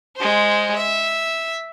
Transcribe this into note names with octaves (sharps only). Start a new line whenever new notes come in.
G#3 C5
E5